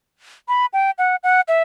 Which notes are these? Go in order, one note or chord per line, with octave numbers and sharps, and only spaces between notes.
B5
G5
F#5
F#5
E5